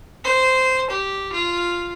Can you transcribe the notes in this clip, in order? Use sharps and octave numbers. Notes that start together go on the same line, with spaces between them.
C5
G4
F4